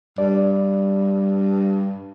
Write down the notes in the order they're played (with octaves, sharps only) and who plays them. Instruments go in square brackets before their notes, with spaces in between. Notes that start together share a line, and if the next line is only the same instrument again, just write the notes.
[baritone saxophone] G2 [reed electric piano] D5